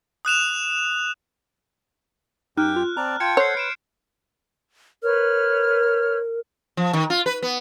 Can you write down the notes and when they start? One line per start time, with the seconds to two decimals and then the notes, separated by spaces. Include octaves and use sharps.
0.25 D#6 F#6 E7 F7
2.57 F#2 D#4 G4 G5 F6 F#6
2.76 F4
2.97 C4 D5 A5 A#5
3.20 F4 G5 A5 G#6 C#7
3.37 A4 C5 C#5 F#5 C6 G6 C7
3.55 B4 G#6 D7 E7
5.03 A#4 B4 C#5 F6
6.77 F3
6.93 D#3
7.10 F4
7.26 B4
7.42 B3